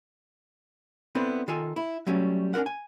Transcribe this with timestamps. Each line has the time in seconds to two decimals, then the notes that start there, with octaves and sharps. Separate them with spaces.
1.15 B3 C4 D4 E4 A4
1.48 D#3 F4 A4 G#5
1.76 E4
2.07 F#3 G3 A3 C#4
2.54 C#4 D4 F#4 A#4 F#5
2.66 G#5